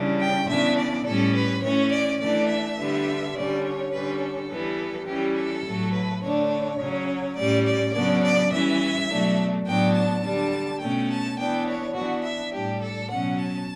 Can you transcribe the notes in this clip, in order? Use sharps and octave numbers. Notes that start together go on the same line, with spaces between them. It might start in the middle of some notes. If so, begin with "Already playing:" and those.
Already playing: C#3 E3 G3 D4
G5
C#3 E3 B3 D4 E5
D5
A2 G3 C#4 A4
B4
E3 A3 C#4 C#5
D5
E3 A3 D4 D5
E5
D3 G3 B3
D3 G3 C#4 D5
C#5
D3 G3 C#4 B4
A4
E3 G3 B3
E3 G3 C#4 G4
A4
A2 F#3 A3
B4
D3 A3 D4 C#5
C#5
C#3 F#3 C#4
A2 G3 C#4 D5
D5
C#3 F#3 B3 D4 D5
D5
E3 G3 C#4 E5
B2 F#3 A3 D4
A2 F#3 B3 D4 G5
A5
D3 G3 D4
B2 A3 C#4 G5
A5
E3 B3 D4 G5
C#5
E3 B3 D4 F#4
E5
A2 G3 D4 G4
A4
B2 F#3 C#4 F#5
A5